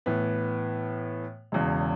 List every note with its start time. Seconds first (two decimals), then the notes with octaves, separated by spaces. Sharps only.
0.06 A2 E3 B3
1.52 E1 E2 C#3